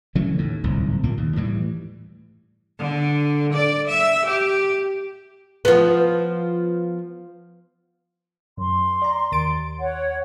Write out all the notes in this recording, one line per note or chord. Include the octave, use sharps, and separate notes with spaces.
C#3 E3 F#3 A3
D#2 A2
D1 C2 G#2
B1 A#2 A#3
D#2
A2 E3 G3
D3
D5
E5
G4
F3 B3
F#2 C6
D5 A#5
D#2 A6 D7
C#5 F#5